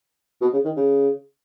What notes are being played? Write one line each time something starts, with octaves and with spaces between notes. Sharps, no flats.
B2
C#3
D#3
C#3